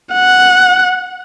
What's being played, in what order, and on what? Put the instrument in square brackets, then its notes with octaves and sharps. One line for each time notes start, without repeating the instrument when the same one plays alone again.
[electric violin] F#5